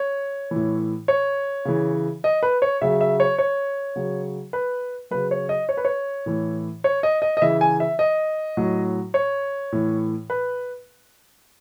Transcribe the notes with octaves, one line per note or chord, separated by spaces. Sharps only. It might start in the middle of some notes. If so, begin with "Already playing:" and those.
Already playing: C#5
A2 E3
C#5
C#3 E3
D#5
B4
C#5
C#3 F#3 E5
E5
C#5
C#5
C#3 F#3
B4
C#3 F#3 B4
C#5
D#5
C#5
B4
C#5
A2 E3
C#5
D#5
D#5
D#5
C#3 E3 E5
G#5
E5
D#5
A2 F#3
C#5
A2 E3
B4